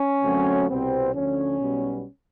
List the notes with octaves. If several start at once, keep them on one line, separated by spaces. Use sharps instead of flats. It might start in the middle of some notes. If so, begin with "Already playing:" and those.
Already playing: C#4
F#2 D3 F#3 A3 C4
C2 B2 G3 B3 C4
D2 D3 F3 C#4
B1 B2 G3 B3